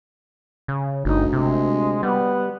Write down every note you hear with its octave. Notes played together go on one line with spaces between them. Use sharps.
C#3
G1 D2 D#4
C3 G#3
G3 B3